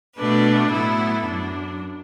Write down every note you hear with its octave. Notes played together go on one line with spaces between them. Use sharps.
B2 A3 D4 B4
A2 F#3 B3 E4 A4
F#2 F#3 D4